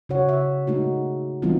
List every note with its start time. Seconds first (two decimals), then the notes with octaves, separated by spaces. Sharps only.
0.09 C#3 F#4 C#5 F#5
0.29 E5
0.67 G#3 A3 D#4 F#4
1.42 E3 G3 B3 C4 D#4 F4